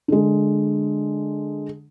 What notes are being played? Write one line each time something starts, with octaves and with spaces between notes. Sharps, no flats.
D3 G#3